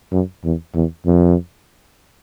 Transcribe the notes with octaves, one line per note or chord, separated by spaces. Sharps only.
F#2
E2
E2
F2